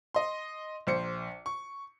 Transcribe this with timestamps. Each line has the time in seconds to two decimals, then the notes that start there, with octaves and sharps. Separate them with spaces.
0.15 D#5 C6
0.87 A#1 C5 C#7
1.46 C#6